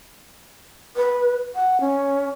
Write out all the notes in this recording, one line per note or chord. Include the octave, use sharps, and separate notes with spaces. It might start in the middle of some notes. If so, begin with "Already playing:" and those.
B4
F#5
C#4